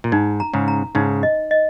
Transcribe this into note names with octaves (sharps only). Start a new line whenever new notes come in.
A#2
G#2 D#4
A#5
G#2 C#3
A#5
G#2 C#3 D#4
D#5
D#5